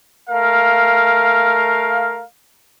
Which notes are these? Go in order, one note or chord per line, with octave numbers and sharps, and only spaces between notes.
A3 A#4 F5